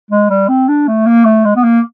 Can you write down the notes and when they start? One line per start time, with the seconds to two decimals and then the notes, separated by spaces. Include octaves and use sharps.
0.11 G#3
0.30 G3
0.48 C4
0.68 D4
0.87 A3
1.06 A#3
1.25 A3
1.45 G#3
1.56 B3
1.63 A#3